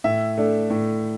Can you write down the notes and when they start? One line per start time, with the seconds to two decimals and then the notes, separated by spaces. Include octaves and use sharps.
0.04 A2 E5
0.37 A3 D4
0.70 A2